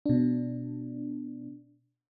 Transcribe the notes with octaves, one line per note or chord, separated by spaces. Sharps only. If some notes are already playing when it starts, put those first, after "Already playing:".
B2 D4